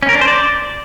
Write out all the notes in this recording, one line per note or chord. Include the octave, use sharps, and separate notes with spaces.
C#4
A#4
D4
C5
D5